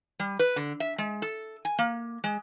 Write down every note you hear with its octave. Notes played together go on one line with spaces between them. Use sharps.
G3
B4
D3
E5
G#3
A4
G#5
A#3
G#3